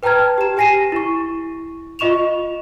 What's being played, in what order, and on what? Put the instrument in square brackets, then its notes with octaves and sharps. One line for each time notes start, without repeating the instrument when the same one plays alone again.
[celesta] B4 G5 A5 A#5 F6 G#6
G4 E7
G4 G#5 A#6 C7 D#7 E7
E4 C#6
F4 D#5 C#6 E7 F7